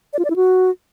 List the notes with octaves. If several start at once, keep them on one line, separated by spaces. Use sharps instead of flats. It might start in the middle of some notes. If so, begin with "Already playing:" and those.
D5
F4
D5
E4
F#4